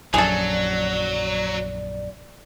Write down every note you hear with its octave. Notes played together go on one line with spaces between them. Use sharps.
A#1 F#2 F#3 G#4 A4 D5